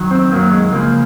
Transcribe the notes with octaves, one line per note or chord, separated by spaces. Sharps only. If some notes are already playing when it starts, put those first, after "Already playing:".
Already playing: F#2 D#3 F#3
C4
F#2 D#3 F#3 A#3
G#3
C#2 C#3 F3 A#3